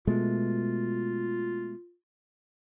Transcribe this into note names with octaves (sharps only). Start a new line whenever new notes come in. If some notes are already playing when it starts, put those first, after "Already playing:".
B2 G#3 A3 F4